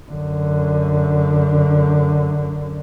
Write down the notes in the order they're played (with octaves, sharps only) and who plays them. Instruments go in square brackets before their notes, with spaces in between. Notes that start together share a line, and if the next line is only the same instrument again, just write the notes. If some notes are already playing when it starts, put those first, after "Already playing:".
[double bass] F#2 D3